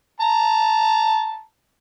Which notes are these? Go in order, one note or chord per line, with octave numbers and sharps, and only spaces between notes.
A5 A#5